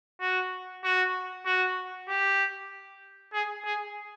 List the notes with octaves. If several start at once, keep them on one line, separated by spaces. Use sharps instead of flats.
F#4
F#4
F#4
G4
G#4
G#4